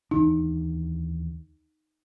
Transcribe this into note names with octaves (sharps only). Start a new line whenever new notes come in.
D#2 E3 D4 D#4